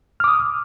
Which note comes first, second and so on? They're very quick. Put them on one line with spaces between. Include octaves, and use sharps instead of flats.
F6 D6 D#6